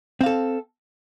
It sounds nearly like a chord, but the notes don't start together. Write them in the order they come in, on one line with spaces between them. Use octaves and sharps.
C4 F5 A4